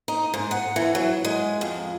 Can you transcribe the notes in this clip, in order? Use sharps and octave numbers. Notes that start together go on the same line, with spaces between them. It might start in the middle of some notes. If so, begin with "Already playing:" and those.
D#4
G#2
F#5
E3
F#3
G#3
F2